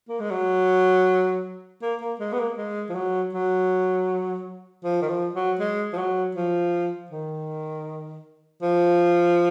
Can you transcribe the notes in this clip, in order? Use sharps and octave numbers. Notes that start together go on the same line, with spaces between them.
A#3
G#3
F#3
A#3
A#3
G#3
B3
A#3
G#3
F3
F#3
F#3
F3
D#3
F3
F#3
G#3
F3
F#3
F3
D#3
F3